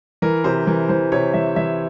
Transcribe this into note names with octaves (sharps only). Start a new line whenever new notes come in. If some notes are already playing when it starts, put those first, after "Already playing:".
E3 A#4
C3 C5
E3 A#4
E3 C5
C3 C#5
E3 E5
E3 E5